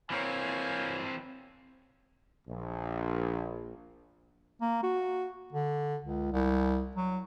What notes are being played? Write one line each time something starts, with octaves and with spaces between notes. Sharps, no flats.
E3 A#3 C4 C#5 G#5
A#1
A#3
F#4
D3
C#2
C2
F#3